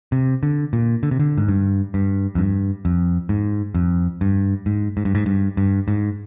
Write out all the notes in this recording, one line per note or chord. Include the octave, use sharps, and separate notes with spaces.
C3
D3
A#2
D3
C3
D3
G#2
G2
G2
F2
G2
F2
G#2
F2
G2
G#2
G#2
G2
G#2
G2
G2
G#2